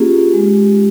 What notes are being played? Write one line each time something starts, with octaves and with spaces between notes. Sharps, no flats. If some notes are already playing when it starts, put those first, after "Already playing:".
Already playing: A#3 C#4 F4 G4 G#4
G#3 G4